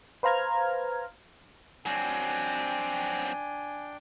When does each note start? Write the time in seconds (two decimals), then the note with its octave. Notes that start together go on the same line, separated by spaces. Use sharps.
0.23 B4 C5 F5 A#5 F6 G#6
1.86 F#3 C4 D4 G5 G#5